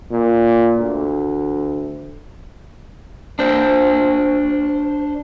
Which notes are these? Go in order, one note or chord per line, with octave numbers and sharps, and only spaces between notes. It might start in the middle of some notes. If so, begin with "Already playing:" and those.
A#2
D2
D4 C5